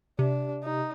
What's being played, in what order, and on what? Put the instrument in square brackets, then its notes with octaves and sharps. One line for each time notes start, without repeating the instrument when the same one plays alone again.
[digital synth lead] C3 [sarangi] D4
[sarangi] D#4